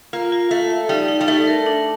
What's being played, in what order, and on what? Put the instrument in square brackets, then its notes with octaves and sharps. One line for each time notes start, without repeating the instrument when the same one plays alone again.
[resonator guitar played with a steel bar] A#3 [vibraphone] F4
[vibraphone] F4
[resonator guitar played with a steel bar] A3 [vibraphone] F5
[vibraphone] F5
[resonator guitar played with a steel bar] G3 [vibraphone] D#4
[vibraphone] D#4
[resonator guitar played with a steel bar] G3
[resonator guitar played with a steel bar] A3 [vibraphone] D#4
[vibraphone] A#4
D4